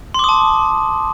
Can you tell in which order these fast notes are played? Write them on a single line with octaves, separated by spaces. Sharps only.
C6 D6 D#6 A5